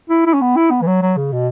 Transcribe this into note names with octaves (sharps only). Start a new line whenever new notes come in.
E4
E4
C#4
B3
E4
B3
E3
F#3
F#3
C#3
B2